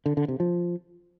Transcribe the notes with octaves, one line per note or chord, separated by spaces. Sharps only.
D3
D3
C3
F3